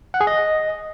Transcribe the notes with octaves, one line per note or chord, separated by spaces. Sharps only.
F#5
G#4
D#5